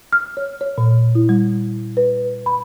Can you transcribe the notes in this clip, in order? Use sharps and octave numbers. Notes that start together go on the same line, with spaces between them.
F6
C#5
C#5
A#2
E4
G3
B4
B5